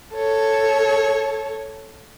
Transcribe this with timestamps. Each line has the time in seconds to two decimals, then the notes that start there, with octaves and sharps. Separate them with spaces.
0.14 A4 C#5